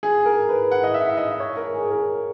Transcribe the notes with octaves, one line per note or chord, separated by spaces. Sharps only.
G#4
A#4
B4
F#5
D#5
E5
D#5
C#5
A#4
G#4
A#4